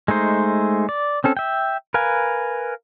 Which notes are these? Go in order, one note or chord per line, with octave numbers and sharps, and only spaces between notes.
G#3 A3 D#4 C5
D5
C4 C#4 A4
E5 G5
A#4 B4 F5 G#5